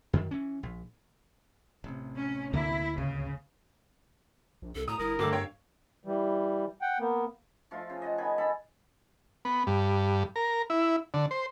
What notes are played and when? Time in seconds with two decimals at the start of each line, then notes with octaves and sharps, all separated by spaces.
0.13 F#2 D#3
0.31 E3 C#4
0.63 A#1
1.84 A1 C3
2.18 C#4
2.53 D2 D3 A#3 E4
2.98 G#1 C#2 C#3
4.62 A#1
4.75 C2 A4
4.88 A2 A#5 D#6
4.99 G1 E4 A#4
5.19 G1 G2 A3 D6 E6
5.33 C#5 F5 G5
6.05 E3 G3
6.82 F#5 G5
7.00 A#3 B3
7.71 F3 A3 F4
7.90 C#3
8.02 D#5 F#5 A5
8.18 D#3 G#4 G#5 B5
8.38 A4 D#5 A5 B5
9.45 B3
9.67 G2
10.36 A#4
10.70 E4
11.14 D3
11.31 C5